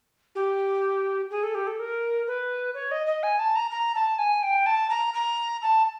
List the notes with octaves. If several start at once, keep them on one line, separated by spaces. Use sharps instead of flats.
G4
G#4
A4
G4
A4
A#4
B4
C#5
D#5
D#5
G#5
A5
A#5
A#5
A5
G#5
G5
A5
A#5
A#5
A5